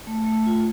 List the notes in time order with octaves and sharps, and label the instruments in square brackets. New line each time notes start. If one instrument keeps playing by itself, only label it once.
[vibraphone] A3
A3
F4